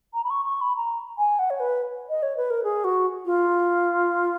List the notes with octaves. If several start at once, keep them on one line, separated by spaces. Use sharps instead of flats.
A#5
B5
C#6
C#6
B5
A#5
G#5
F#5
C#5
B4
D#5
C#5
B4
A#4
G#4
F#4
F4